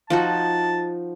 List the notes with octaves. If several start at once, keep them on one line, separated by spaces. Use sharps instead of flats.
F3 D#4 F#4 A5